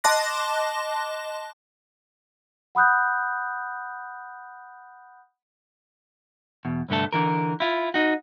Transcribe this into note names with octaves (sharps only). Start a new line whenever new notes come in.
D#5 A5 C6 D6 F#6 A#6
F#5 B5 D#6 F#6 G6
E2 B2
C2 G2 D3 A3 A4
D3 E3 A#4
E4 F4
D#4 F#4